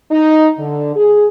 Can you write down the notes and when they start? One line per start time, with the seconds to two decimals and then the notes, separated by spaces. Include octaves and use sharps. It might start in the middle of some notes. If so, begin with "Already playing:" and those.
0.11 D#4
0.59 D3
0.96 G#4